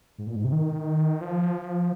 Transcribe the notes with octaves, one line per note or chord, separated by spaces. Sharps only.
G#2
A#2
G#2
C3
D#3
F3